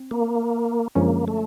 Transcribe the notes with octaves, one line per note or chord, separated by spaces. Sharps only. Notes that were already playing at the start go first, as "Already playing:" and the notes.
Already playing: C4
A#3
F#2 D3 F3 G#3 A#3 C#4
A3